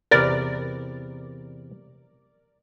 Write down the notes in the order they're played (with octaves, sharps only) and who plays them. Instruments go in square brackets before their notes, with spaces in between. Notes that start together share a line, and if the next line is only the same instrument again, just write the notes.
[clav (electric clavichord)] E2 C3 B4 [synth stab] A#4 D5